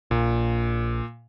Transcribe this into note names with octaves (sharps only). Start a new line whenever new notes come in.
A#1 A#2